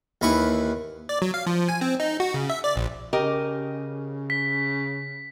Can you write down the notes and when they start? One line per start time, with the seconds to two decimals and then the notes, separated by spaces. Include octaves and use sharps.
0.21 D#2 E3 B5 C#6
1.09 D5
1.22 F#3
1.34 F5
1.47 F3
1.69 G#5
1.81 C4
2.00 D#4
2.20 F#4
2.34 C#3
2.50 E5
2.64 D5
2.76 A#1
3.13 C#3 G4 A#4 D#5
4.30 B6